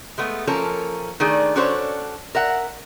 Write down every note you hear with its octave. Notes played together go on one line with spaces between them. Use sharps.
G#3 A3 B3
F3 A#3 C#4 A4 A#4
D#3 A3 D4 G#4
C#4 D4 F#4 A4 C5 C#5
A#4 E5 F#5